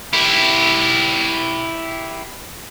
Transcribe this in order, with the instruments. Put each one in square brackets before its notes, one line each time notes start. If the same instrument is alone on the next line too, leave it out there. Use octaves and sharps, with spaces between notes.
[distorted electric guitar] E4 G4